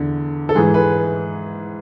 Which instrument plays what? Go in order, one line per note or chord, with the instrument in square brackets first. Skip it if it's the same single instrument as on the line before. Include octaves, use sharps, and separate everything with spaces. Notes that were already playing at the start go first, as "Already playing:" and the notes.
Already playing: [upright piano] E2 D3
A4
G#2 E3 G#4
B4